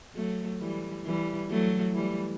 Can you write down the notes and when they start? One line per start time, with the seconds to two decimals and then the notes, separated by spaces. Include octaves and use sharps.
0.15 F#3 A3
0.60 E3 G3
1.05 E3 G3
1.50 F#3 A3
1.94 E3 G3